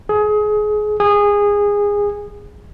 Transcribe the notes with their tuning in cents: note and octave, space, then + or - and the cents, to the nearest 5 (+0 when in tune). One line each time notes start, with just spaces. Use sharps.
G#4 +25
G#4 -20